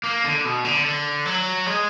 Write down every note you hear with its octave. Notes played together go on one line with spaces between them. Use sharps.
A#3
D3
B2
D3
D3
F#3
G#3